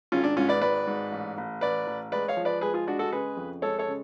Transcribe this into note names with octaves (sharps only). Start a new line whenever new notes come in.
G#1 C#4 F4
D4
G#2 C#4 F4
B4 D5
G#1 B4 D5
G#2
A1
A1
A1 B4 D5
A1
G#3 B4 D5
C#5 F5
F3
B4 D5
G#3 G#4 B4
F4 G#4
G#3 D4 F#4
F#4 A4
C#3 G#4 B4
F2
G#3 A4 C#5
A4 C#5
C#3